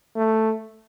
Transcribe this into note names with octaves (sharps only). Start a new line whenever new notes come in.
A3